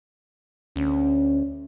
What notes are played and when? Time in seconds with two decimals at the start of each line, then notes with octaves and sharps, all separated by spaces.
0.76 D2 C#4